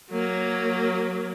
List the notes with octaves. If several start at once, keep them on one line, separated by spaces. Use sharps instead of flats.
F#3 A#3